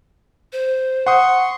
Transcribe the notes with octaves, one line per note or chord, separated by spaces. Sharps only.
C5
F#5 C6 C#6 D#6